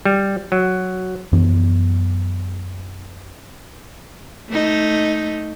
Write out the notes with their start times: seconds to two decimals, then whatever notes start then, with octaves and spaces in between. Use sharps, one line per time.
0.05 G3
0.52 F#3
1.33 F#2 E3 B3 D4
4.50 A3 D#4